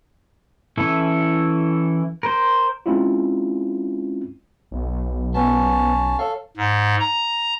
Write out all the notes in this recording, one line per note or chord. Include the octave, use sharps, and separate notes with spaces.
E3 C#4 E4 A4 E5
A#4 C5
G#3 C4 C#4 E4 F4
B1
B3 C#4 A5
A4 C#5 F5
G#2
A#5